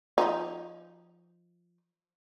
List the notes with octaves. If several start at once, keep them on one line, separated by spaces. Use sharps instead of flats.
F3 D#4